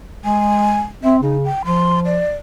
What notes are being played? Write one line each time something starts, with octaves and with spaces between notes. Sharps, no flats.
G#3 G#5
C4 E5
C#3 D#4
G5
F3 C6
D5